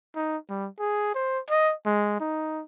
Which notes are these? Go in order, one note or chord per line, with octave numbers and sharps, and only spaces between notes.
D#4
G3
G#4
C5
D#5
G#3
D#4